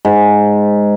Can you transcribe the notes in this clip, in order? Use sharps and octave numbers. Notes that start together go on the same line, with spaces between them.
G#2